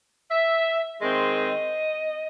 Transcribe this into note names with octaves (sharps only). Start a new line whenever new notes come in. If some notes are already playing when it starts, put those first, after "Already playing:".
E5
D#3 G#3 C4 D#5